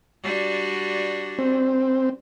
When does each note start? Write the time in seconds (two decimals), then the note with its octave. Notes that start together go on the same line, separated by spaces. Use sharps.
0.24 G3 D4 F#4
1.39 C4